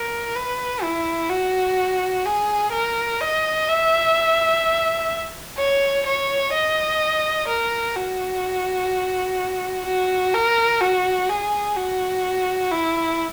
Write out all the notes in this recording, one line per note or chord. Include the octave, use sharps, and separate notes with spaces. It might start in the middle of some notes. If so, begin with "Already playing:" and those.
Already playing: A#4
B4
E4
F#4
G#4
A#4
D#5
E5
C#5
C#5
D#5
A#4
F#4
F#4
A#4
F#4
G#4
F#4
E4